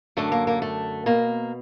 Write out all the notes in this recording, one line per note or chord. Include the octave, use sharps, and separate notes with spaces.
F#2 D3 A3
A#3
A#3
A3
B2 A#3